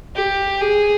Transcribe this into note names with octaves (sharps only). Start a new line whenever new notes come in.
G4
G#4